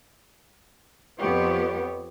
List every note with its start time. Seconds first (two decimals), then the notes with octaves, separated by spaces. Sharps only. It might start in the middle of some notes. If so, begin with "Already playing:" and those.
1.18 F2 B3 G4 C#5